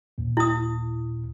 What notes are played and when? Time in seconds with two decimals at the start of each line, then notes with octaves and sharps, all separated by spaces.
0.18 D#2 A#2
0.37 E4 D#6